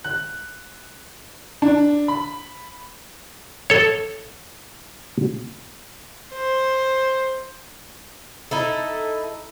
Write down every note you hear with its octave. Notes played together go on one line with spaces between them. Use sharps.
F#6
D4
B5
A4 C#5
C5
D#4 E4 A4